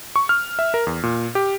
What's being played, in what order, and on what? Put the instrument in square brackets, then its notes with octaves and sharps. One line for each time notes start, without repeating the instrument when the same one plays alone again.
[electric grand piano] C#6
F6
E5
A#4
E2
A#2
G4